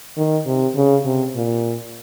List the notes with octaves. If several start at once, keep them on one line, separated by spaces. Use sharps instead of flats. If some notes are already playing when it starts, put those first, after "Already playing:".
D#3
C3
C#3
C3
A#2